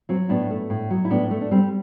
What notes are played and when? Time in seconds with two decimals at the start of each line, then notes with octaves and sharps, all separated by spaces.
0.09 F#3 C4
0.29 A2 B3 D4
0.50 A3
0.70 A2
0.90 F#3
1.05 E4
1.10 A2 B3 D4
1.31 A3
1.41 D4
1.51 G3 C4